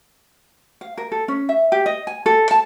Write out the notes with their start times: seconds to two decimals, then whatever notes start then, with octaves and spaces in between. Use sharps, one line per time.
0.81 F5
0.98 A#4
1.12 A4
1.28 C#4
1.49 E5
1.72 G4
1.86 D#5
2.07 G#5
2.26 A4
2.51 A5